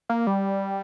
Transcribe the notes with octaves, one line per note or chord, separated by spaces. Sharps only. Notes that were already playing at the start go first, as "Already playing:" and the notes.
A#3
G3